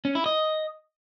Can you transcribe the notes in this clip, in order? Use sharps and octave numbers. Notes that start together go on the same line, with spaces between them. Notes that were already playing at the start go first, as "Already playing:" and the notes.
C#4
E4
D#5